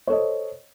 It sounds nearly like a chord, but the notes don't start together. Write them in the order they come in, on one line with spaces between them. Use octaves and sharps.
C#5 A4 D#5 C5